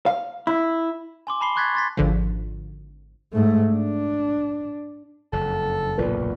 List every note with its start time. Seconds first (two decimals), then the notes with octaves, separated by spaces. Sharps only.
0.06 F5
0.47 E4
1.27 G#5 C6 D6
1.41 A5 B5 C7 G7
1.56 C6 C#6 F#6 G#6 A6 B6
1.75 C6 A6 B6
1.97 G#1 D3 F3
3.33 G#2 A3
3.73 D4
5.33 F#1 F2 A4
5.98 F#1 B1 E2 A#2 B4